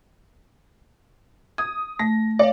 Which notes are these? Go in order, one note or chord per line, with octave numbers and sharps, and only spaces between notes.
D#6 G#6
A3 A#6
C#5 D5 F5